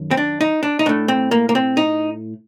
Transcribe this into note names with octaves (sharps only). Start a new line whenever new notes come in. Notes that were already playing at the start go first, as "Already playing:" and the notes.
Already playing: F#2 D#3
C4
D4
D#4
D4
D#4
A2 A3 D4
C4
A#3
A#3
C4
D#4